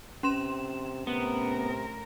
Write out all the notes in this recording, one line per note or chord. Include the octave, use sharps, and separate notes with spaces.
C3 C#4 C6 E7
A2 C3 B3 A#4